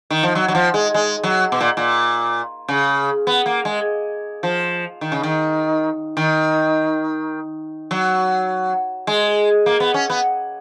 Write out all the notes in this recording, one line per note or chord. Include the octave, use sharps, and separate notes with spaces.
D#3
F3
F#3
F#3
F3
G#3
G#3
F#3
B2
A#2
A#2
C#3
B3
A#3
G#3
F3
D#3
C#3
D#3
D#3
F#3
G#3
A#3
B3
C#4
B3